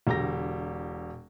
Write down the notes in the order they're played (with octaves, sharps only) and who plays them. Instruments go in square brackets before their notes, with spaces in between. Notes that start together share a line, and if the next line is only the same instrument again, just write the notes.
[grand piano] E1 D3 G4 A#5 A#6